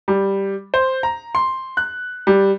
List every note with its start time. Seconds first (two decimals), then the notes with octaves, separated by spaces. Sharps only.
0.08 G3
0.74 C5
1.03 A#5
1.35 C6
1.77 F#6
2.27 G3